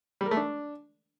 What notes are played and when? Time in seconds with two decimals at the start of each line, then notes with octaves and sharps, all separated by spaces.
0.21 G3
0.26 A#4
0.31 A3
0.37 D4